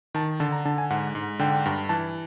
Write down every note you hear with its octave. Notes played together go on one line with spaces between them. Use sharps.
D#3 A5
D3 A5
A#5
D3 A5
G#5
G#2 F#5
G#2
D3 G5
G2
E3 A5